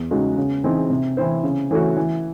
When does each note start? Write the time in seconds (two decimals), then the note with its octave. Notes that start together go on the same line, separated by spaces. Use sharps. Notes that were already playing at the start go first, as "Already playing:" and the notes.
Already playing: E2
0.11 C#3 G#3 D#4 F#4
0.37 C#3
0.64 E3 C4 D#4 G#4
0.90 C3
1.17 E3 C4 E4 C5
1.43 C#3
1.71 E3 A3 C#4 F#4
1.96 E3